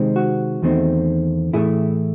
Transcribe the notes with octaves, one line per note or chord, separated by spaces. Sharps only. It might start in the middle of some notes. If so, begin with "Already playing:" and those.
Already playing: C3 D#3 G#3 C4
F#4
E2 D#3 A3 C4
A2 E3 A3 E4 G#4